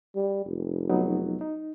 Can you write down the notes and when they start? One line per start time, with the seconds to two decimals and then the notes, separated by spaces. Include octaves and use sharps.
0.15 G3
0.45 F1
0.89 F#3 B3 D#4
1.41 D#4